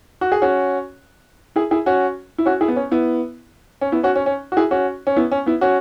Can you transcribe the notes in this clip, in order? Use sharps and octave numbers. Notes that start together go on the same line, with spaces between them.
F#4
G#4
C#4 F#4
E4 G#4
E4 G#4
C#4 F#4
E4
C#4 F#4
E4 G#4
B3
C#4
B3 E4
C#4
B3 E4
C#4 F#4
C#4
C#4
F#4
E4 G#4
C#4 F#4
C#4
B3 E4
C#4
B3 E4
C#4 F#4